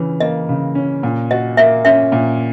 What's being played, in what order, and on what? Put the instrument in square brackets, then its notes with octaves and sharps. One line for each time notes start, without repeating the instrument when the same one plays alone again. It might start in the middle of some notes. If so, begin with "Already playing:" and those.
Already playing: [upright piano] C#3 E3 C#4
[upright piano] A#3 [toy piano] D#5
[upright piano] C#3
C#4
A#2
[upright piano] F#4 [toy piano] D#5
[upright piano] A#3 [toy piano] E5
[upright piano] C#4 [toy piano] E5
[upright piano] A#2